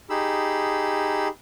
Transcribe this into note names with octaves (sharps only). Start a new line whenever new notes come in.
D#4 G4 G#4 B5 E6